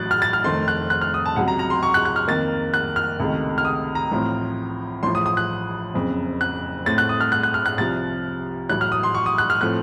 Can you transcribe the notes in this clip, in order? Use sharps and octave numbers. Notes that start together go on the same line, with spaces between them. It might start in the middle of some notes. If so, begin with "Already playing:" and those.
Already playing: A1 A2 F#3 F#6 A6
F6
A6
F6
F1 F2 D#3 A3 C4 C6
F#6
F#6
F6
D#6
A5
C#2 C3 F#3 F#5
A#5
A#5
C6
C#6
F#6
F#6
F6
F2 D#3 A#3 A6
F#6
F6
C#2 C3 D#3 A3
F6
D#6
A#5
A1 A2 F3 C4
A1 A2 F3 C6
D#6
D#6
F#6
F#1 F2 C#3
F#6
A2 A3 C4 A6
F#6
D#6
F6
F#6
F#6
F6
F#6
C2 C3 F3 A6
A1 A2 F#3 F#6
F6
D#6
C6
C#6
D#6
F#6
F6
A2 F3 A3 C4 F#6